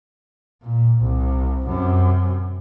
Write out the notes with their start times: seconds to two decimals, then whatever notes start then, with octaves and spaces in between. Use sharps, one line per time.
0.62 A#2
1.02 C2
1.67 F#2 C3